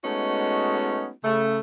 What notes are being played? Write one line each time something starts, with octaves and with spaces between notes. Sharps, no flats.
G#3 A3 B3 C#4 D#4 F#4
C#3 A3